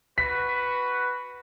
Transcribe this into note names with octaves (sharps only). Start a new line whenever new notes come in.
F#4 B4 B6